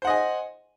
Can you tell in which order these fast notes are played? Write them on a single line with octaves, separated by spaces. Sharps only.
C5 F#5 D#5 G#5